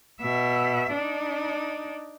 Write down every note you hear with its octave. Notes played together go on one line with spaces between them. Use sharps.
B2 E5
D4 D#4